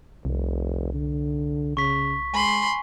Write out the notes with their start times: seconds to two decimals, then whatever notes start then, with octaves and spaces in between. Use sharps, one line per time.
0.25 F1 C2
0.93 D3
1.77 C#3 C#6 B6
2.34 G#3 G#5 B5 C6